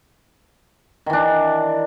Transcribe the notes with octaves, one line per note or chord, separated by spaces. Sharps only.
D#3 E3 D4